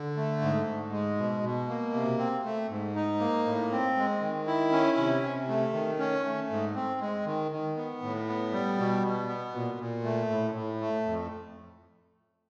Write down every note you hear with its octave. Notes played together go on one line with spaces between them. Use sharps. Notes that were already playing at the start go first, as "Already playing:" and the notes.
Already playing: D3
A3
G#2
G#2
G#3
B2
B2
A#3
C3
C4
A3
G#2
D#4
A#3
A2
C4
G#3
D#3
E4
C#4
C3
C3
A3
D#3
C#4
A3
G#2
C4
G#3
D#3
D#3
B3
A2
B3
G3
B2
B2
B3
A#2
A#2
A3
A2
A2
A3
F2